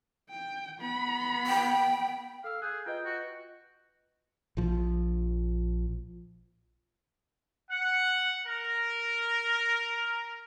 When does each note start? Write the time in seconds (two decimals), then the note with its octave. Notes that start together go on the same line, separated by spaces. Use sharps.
0.30 G5
0.80 B3 B5
1.47 G5
2.44 A4 F5 E6
2.62 G#4 F#6 G6
2.86 F4 B4 D#5 G5
3.06 F#4
4.57 A#1 F3
7.71 F#5
8.45 A#4